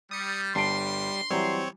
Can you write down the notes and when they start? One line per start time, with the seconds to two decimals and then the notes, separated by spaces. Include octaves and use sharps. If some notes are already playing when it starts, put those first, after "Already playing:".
0.11 G3 D#6 C#7
0.55 G1 G3 A5 C6 D7
1.31 E3 F#3 G3 C4 C#5